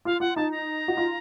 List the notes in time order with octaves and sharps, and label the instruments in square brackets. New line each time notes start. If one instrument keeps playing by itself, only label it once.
[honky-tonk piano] F4 [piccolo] F5
[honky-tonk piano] F4 [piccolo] F#5
[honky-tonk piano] D#4 [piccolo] A5
[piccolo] A#5
[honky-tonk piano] F#4
F4